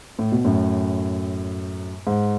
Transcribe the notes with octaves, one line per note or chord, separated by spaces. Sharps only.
A2
B2
F#2 A2
G#2